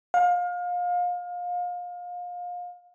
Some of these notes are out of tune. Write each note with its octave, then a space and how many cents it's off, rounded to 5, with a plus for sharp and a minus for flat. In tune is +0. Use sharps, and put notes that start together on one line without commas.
F5 +30